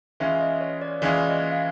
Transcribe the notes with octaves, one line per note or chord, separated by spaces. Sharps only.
E3 G#3 C#4 F4 G#4 E5
D#5
C#5
D5
E3 G#3 C#4 F4 G#4 D5
D#5
F5